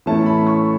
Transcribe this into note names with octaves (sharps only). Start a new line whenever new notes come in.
A2 E3 A3 C#4 E4 A5
B5
C#6